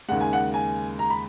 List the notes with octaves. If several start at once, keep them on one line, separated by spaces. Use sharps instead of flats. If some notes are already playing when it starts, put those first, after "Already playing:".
D#2 C#3 G#3 F#5
G#5
F#5
G#5
A#5
B5